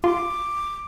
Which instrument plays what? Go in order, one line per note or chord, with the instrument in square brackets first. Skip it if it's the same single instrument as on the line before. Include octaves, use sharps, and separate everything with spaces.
[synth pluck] F4 [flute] D6